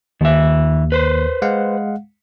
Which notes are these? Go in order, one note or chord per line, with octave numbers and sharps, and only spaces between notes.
D#2 D#3 E5
B4 C5
G#3 F5 F#5